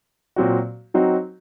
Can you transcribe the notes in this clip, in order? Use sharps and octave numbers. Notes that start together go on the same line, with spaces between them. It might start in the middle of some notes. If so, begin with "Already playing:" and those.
A#2 F#3 C4 F#4
F#3 C4 D#4 F#4